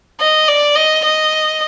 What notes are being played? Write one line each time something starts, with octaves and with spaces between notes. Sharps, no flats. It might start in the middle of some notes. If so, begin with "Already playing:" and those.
D#5
D5
D#5
D#5